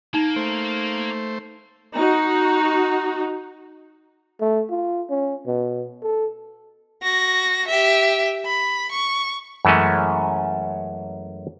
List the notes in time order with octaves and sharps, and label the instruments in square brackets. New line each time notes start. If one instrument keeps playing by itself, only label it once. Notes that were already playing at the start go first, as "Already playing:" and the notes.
[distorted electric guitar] A#3 [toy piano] D#4
[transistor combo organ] A3 C5
[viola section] D#4 F#4
[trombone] A3
F4
C#4
B2
A4
[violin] F#4 A#6
G4 E5
B5
C#6
[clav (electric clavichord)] F#2 E3 G#3 A3 C#4